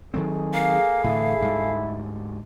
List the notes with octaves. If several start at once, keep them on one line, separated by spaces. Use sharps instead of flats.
D#3 F#3 C4 G#4 A4
A#3 F5
A2 D3 E3 E4
D2 G#2 G3